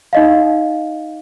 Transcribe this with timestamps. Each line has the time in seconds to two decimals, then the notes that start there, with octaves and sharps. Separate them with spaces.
0.13 D#4 D#5 F5